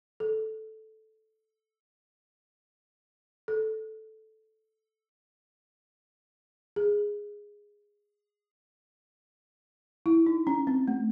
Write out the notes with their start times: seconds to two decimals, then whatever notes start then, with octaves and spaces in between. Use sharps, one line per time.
0.20 A4
3.48 A4
6.76 G#4
10.06 E4
10.26 D#4
10.47 C#4
10.67 C4
10.88 A3